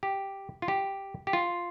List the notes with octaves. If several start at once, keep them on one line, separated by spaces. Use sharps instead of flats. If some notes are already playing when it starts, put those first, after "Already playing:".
G4
F4
G4
G4
F4